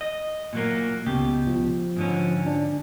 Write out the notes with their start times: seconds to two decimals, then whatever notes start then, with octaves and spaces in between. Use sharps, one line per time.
0.01 D#5
0.53 A#2 F#3 A#3
1.06 C#2 B2 G4
1.47 F3
1.96 G#2 D3 C#4
2.46 D4